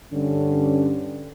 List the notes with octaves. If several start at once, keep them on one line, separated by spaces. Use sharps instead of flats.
G2 D3 C#4